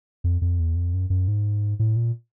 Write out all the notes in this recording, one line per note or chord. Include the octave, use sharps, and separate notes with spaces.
F2
F2
E2
F2
F#2
F#2
G#2
A2
A#2